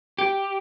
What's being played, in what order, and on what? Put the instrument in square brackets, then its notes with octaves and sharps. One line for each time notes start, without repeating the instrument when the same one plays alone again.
[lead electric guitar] G4